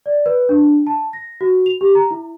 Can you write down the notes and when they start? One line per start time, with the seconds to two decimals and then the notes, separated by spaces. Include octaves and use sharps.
0.06 D5
0.26 B4
0.49 D4
0.87 A5
1.13 A#6
1.41 F#4
1.66 F7
1.81 G4
1.95 A#5
2.11 E4